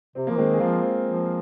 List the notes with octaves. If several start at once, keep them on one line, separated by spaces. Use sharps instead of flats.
C3 C4
F3 A#3
D#3 G#3 C4
G#4
F3 C4 F4
F3